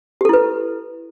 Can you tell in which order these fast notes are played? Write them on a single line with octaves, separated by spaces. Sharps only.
G4 A4 E4 B4